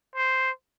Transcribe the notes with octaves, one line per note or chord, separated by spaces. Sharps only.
C5